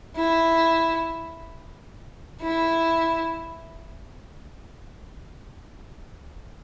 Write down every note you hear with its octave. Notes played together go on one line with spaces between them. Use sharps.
E4
E4